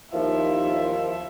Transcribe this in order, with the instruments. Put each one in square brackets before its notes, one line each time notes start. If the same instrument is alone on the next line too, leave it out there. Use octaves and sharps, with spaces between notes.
[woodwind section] D#2 F3 [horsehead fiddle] E4 E5